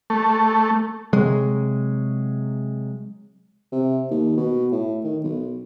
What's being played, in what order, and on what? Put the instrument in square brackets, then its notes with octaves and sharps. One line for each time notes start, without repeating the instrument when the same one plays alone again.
[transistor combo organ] A3
[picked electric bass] C3 F#3 G#3
[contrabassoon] C3
D#2
B2
A2
D#3
B1